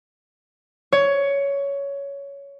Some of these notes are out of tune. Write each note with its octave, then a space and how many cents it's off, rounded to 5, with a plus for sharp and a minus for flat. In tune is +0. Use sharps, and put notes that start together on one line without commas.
C#5 +15